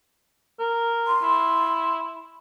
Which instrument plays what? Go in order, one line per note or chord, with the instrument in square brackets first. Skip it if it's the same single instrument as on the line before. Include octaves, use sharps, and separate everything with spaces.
[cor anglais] A#4
[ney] C6
[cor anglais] E4